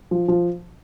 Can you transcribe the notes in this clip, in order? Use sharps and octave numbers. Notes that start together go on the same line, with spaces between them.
F3
F3